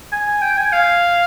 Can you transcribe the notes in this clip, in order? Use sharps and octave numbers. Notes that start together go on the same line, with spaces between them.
G#5
G5
G#5
F5